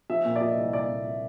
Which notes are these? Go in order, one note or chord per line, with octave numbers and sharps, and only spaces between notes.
F3 E5
A#2
D5
F3 D#5
C2
C2 D5
A#2